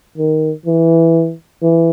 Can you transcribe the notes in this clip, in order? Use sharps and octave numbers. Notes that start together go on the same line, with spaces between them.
D#3
E3
E3